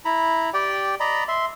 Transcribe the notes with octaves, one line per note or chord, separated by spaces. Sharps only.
E4 A#5 B5
G4 D5 G5
D5 D#5 A#5 B5
E5 C6